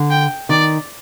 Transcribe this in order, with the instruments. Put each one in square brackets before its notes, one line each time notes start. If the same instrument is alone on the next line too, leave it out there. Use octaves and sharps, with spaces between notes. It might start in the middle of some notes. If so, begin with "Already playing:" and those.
Already playing: [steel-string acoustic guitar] D3
[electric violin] G5
[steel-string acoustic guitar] D#3 [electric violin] D5